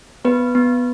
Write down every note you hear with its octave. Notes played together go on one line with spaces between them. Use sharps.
B3 B4
B3